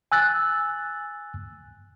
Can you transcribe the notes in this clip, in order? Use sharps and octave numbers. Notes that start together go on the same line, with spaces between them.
G#5 E6 F#6 A6